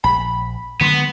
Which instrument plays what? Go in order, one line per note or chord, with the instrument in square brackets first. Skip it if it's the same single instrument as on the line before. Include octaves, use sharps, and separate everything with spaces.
[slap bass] A#1 [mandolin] B5
[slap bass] D3 F#3 G#3 [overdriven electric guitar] B3